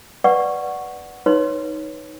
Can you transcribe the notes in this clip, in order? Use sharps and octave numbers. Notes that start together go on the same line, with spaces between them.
B4 D5 F#5 C#6
D#4 B4 C#5 C6